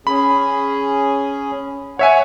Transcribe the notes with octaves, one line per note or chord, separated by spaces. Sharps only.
C#4 G#4 B5
C#5 E5 F#5 G#5